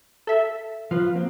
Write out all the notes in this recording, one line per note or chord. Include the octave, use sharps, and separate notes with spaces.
A4 E5
F3 F4 B4 F5
A#3 C4 F#4